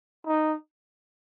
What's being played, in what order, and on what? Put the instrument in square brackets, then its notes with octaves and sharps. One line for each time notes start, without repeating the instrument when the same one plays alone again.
[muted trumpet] D#4